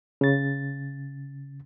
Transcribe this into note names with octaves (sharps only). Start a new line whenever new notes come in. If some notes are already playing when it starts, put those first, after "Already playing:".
C#3 A6